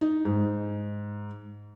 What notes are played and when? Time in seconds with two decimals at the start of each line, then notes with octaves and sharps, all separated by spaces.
0.01 D#4
0.25 G#2